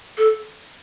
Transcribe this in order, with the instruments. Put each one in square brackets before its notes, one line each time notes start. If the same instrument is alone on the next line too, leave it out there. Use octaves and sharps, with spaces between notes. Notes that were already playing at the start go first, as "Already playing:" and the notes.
[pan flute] A4